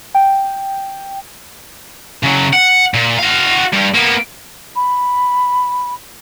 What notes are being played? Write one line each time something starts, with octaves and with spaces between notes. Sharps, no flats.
G5
C#3 F#3
F#5
A#2
F#4 F5
G2
A#3 B3
B5